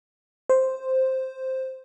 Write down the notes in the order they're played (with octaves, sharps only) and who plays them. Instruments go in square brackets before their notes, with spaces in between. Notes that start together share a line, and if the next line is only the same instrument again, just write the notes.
[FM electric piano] C5